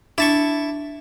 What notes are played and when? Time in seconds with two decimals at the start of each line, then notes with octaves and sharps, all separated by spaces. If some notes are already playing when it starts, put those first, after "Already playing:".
0.18 D4 E4 A5 C#6